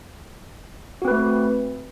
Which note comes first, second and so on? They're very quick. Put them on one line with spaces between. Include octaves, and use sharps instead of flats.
F#4 C4 B4 A3